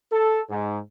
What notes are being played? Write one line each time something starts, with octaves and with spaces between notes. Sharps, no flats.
A4
G#2